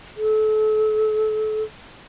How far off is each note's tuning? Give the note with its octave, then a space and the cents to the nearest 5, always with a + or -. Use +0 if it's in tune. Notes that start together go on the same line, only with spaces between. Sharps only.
A4 -30